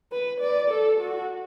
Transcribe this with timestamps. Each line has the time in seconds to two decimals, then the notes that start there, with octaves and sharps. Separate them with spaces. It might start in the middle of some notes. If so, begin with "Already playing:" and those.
0.12 B4
0.41 D5
0.71 A4
1.00 F#4